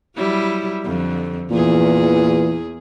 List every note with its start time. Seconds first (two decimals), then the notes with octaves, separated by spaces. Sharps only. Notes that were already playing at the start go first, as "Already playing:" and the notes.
0.16 F#3 G3 E4
0.85 F2 D3
1.51 E2 A#2 E3 G#4